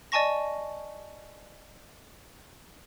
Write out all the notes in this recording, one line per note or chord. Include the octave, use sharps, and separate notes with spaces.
D5 D#5 G#5 A5 C#6 A#6